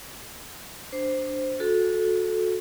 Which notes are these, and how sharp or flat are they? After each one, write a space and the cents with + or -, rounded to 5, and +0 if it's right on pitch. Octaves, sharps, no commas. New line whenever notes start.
D4 +0 C5 +0
F#4 -25 A4 -10